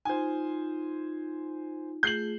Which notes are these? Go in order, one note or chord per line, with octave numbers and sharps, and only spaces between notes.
D#4 F4 C5 G#5
A3 F4 G#4 G6 C7 F#7